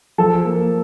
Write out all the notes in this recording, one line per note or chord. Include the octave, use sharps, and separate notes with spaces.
F3 A4
A#3